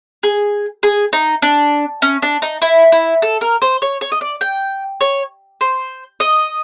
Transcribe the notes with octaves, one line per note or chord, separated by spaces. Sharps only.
G#4
G#4
D#4
D4
C#4
D4
D#4
E4
E4
A4
A#4
C5
C#5
C#5
D#5
D5
G5
C#5
C5
D#5